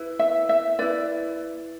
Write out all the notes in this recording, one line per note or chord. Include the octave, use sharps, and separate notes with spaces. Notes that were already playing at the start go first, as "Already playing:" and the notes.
Already playing: E4 B4
E5
E5
E4 B4 D5